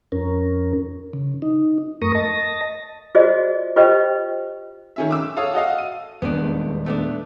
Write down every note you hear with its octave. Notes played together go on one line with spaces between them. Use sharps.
F2 C#4 A#4
C#3
D#4
F#2 A3 A#4 C#6 D#6 A#6
D#5 A5 A#6
F4 F#4 G#4 C5 D5 D#5
F4 G4 B4 C5 D#5 G5
D#3 C#4 E5
D6 E6
A4 C#5 F5 D#6
F#4 A4 D#5 F5
D#7
D#1 E2 G#3 B3 D4
A3 B3 D4